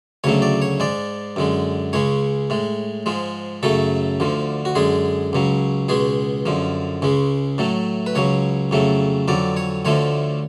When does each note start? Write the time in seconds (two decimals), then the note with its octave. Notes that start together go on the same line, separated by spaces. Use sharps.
0.24 D2 C#3 F#3 A3 C#5
0.42 D5
0.62 C#5
0.80 G#2 G#3 D5
1.36 F#2 D3 G#3
1.93 C#2 C#3 G#3 C#5
2.50 A2 G#3
3.06 G#2 F3 G#3
3.63 F#2 C#3 F#3 A3 A4
4.20 D2 D3 F3
4.65 F#4
4.75 F#2 D3 G#3 G#4
5.33 C#2 C#3 F#3
5.89 C#2 B2 G#3 G#4
6.46 F#2 D3 F3
7.02 C#2 C#3 G#3
7.58 A2 F#3 A3
8.06 B4
8.15 C#2 C#3 F#3 C#5
8.71 F2 C#3 F#3 A3
9.28 F2 D3 F#3 D5
9.57 C#5
9.85 D2 D3 F3 A3 C#5